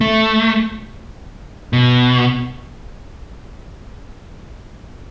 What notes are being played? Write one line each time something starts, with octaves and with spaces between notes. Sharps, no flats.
A3
B2